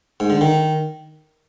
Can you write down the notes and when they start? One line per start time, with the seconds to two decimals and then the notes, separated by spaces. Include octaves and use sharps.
0.20 G#2
0.30 D3
0.41 D#3